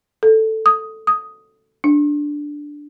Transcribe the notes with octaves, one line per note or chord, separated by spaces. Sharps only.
A4
D#6
D#6
D4